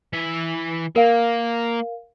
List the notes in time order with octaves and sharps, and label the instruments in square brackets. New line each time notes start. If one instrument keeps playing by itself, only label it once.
[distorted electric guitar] E3 E5
[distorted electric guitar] A#3 [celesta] A#4 F5